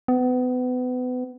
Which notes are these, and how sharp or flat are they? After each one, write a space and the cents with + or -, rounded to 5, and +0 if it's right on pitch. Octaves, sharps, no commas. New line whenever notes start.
B3 +30